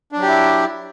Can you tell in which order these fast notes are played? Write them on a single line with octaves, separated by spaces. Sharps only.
D4 F#3 G4 E4